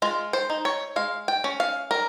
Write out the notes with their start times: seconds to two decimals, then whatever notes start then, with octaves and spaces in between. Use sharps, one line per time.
0.02 G#3 F4
0.33 C5
0.50 D#4
0.65 C#5
0.96 G#3 F5
1.28 G5
1.44 C#4
1.60 F5
1.91 G3 A#4